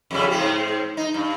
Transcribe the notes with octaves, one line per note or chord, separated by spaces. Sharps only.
F2 C#3 G3
G#2 C4
D#4
G2